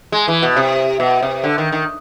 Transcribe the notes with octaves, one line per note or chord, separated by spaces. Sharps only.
G#3
E3
B2
C3
B2
C3
D3
D#3
D#3